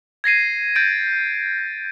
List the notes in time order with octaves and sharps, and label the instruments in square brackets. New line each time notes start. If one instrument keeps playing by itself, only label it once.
[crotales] G#6 A#6 C7 D#7
G6 A6 D7